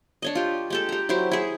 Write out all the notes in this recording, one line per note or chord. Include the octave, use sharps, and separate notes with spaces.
D4 C#5 D#5
F4 G4
G#3 G4 A4
G4 A#5
F#3 E4 G4 C5
E4 G#4